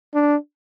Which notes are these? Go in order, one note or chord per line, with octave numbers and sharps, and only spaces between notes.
D4